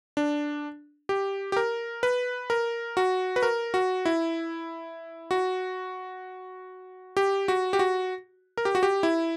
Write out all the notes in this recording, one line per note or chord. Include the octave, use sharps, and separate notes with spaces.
D4
G4
G4
A#4
B4
A#4
F#4
B4
A#4
F#4
E4
F#4
G4
F#4
G4
F#4
A#4
G4
F#4
G4
E4